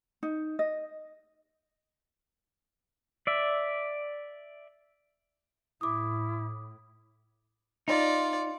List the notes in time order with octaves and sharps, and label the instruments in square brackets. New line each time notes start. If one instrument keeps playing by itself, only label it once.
[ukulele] D#4
D#5
[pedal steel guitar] D5 E5
[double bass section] A2 [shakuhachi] E4 [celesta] D6 D#6
[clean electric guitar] D#4 [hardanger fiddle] F4 D5